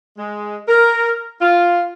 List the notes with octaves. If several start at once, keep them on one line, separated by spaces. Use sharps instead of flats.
G#3
A#4
F4